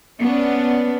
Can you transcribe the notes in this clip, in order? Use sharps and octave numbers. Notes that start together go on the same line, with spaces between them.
B3 C#4 D4